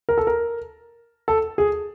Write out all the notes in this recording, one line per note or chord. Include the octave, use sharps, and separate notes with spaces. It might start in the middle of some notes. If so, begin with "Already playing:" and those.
A#4
A4
A#4
A4
G#4